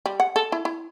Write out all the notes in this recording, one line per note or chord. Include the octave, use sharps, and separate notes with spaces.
G3
F#5
A4
E4
E4